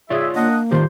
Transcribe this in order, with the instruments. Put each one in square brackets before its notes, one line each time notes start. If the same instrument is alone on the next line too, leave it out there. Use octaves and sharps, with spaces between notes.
[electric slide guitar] F4 C#5 D5 [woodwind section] G#4 E5
[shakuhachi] A#3 [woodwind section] D4 D#5 F#5
[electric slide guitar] D#3 F4 G4 [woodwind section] C5